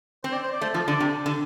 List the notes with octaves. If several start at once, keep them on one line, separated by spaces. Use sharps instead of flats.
C4 C5
D5
C5
D5
A3 C5
F3 A4
D3 D5
C3
D3